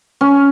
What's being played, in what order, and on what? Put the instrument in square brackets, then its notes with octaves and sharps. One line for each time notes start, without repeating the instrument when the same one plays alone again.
[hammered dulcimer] C#4